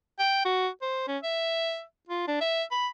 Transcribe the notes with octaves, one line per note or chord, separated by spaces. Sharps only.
G5
F#4
C5
C#4
E5
F4
D4
E5
B5